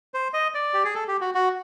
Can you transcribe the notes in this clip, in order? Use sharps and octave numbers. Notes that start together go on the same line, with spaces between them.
C5
D#5
D5
G4
G#4
A4
G4
F#4
F#4